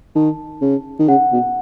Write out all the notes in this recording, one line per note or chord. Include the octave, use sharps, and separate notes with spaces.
D#3 A5
C#3
D#3
C#3 F#5
B2